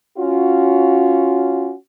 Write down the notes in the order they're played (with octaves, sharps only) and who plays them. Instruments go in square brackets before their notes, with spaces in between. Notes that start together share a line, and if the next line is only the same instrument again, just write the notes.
[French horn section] C#4 F4 F#4